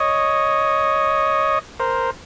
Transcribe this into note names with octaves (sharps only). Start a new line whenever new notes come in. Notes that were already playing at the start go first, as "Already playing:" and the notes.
Already playing: C#5 D#5
A#4 C5